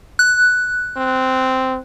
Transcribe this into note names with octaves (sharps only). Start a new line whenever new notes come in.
F#6
C4